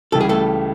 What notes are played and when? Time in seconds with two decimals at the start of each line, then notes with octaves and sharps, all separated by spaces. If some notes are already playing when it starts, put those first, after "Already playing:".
0.12 C#2 C#3 E3 G3 A4
0.21 G#4
0.29 A3 A4